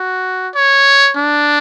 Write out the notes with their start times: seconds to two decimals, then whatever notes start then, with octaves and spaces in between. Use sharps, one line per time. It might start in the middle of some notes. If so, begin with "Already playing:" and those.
Already playing: F#4
0.55 C#5
1.17 D4